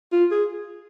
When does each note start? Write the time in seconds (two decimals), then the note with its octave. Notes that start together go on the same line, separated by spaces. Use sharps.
0.12 F4
0.31 G#4